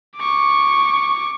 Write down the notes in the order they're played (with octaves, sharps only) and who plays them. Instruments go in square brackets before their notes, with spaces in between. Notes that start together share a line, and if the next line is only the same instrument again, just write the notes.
[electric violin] C#6 D6